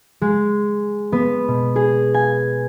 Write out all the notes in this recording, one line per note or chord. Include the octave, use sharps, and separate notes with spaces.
G#3
B3
B2
G#4
G#5